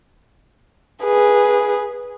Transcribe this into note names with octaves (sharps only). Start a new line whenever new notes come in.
G#4 B4